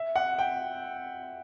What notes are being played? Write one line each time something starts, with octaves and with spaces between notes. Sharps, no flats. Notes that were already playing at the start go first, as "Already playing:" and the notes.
Already playing: E5
F#5
G5